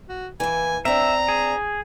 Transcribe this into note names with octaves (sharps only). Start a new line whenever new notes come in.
F#4
E3 A#3 G#5
C4 D4 E5 A#5
G#4